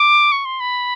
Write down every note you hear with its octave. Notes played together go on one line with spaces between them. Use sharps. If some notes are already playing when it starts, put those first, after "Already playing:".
Already playing: D6
C#6
C6
B5